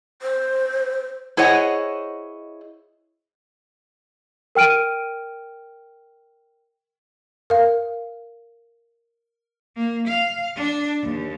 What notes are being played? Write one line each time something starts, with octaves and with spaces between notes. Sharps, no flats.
C5
E4 G#4 C5 C#5 D#5 F#5
A#4 G5 F6 D7 D#7
A#4 F5
A#3
F5
D4
D#2